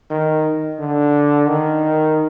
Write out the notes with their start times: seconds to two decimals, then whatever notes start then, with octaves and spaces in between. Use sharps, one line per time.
0.10 D#3
0.79 D3
1.49 D#3